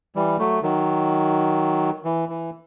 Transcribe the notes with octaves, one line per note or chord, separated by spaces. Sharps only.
E3 G3
F#3 A3
D#3 F#3
E3
E3